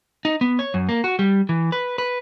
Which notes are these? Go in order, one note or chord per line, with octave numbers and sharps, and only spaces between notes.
D#4
B3
C#5
F#2
A#3
F#4
G3
E3
B4
B4